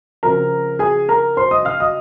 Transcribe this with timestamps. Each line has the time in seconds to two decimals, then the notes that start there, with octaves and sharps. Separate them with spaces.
0.23 C#3 F3 C4 A#4 A#5
0.79 G#4 G#5
1.09 A#4 A#5
1.37 C5 C6
1.51 D#5 D#6
1.65 F5 F6
1.80 D#5 D#6